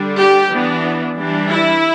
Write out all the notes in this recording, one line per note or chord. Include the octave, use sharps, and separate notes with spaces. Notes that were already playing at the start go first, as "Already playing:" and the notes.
Already playing: D3 G3 D4
G4
E3 B3 D4
E3 G3 D4
E4